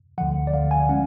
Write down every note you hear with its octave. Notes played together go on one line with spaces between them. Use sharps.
D2 D3 F3 F#5
D5
D2 D3 F3 F5
G#5
G#3 C#4 F#5